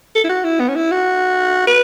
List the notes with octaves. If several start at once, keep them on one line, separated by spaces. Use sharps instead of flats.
A4
E4
F#4
E4
B3
C#4
E4
F#4
B4